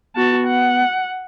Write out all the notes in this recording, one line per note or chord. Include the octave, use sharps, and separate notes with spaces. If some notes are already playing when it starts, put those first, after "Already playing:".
B3 F#4 A5
F#5